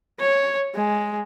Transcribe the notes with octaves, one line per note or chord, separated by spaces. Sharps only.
C#5
G#3